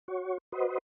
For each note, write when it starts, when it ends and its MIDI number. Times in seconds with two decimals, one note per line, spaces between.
0.08 0.38 66
0.08 0.38 73
0.52 0.78 66
0.52 0.78 71
0.52 0.78 72
0.52 0.78 75